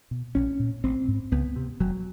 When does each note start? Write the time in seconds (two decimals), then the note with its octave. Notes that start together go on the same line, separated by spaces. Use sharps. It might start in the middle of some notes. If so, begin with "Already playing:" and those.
0.11 B2
0.35 A#1 C#4
0.59 A#2
0.84 A1 C4
1.08 G#2
1.32 C#2 B3
1.56 C3
1.80 F1 F#3